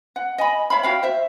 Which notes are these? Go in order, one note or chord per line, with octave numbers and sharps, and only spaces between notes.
F#5
D#5 G#5 B5
C#5 E5 F5 B5
F#4 F5 G5
C5 E5